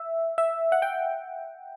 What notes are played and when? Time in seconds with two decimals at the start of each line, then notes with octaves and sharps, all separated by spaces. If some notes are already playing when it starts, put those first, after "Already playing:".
Already playing: E5
0.38 E5
0.72 F#5
0.82 G5